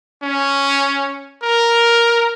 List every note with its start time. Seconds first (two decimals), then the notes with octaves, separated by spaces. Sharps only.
0.23 C#4
1.43 A#4